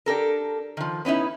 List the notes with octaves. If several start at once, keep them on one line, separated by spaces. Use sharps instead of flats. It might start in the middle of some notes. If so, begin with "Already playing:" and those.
D4 G4 A4 A#4
D#3 F3
B3 C#4 D#4 E4